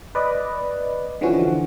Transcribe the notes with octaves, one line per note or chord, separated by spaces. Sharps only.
B4 D5 D#5
D3 E3 F3 C#4 F#4